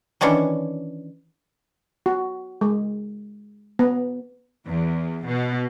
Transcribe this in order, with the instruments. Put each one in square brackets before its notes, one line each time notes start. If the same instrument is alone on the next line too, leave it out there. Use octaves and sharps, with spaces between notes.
[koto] D#3 E3 C#4 D4 C#5
[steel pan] F#4
G#3
B3
[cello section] E2
B2